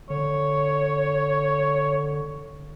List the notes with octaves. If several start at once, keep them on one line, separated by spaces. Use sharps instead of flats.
D3 C#5